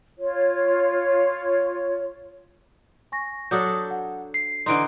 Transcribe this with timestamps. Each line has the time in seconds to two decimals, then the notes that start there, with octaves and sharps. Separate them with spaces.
0.18 F4 C#5
3.12 G#5 C#6 A#6
3.51 F#3 D4 A4 D#6 G6
3.91 F#5
4.34 C7
4.66 D3 E3 D#4 C6 D7